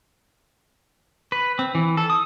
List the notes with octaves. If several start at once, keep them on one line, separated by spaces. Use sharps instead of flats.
B4
C4
E3
A4
D#6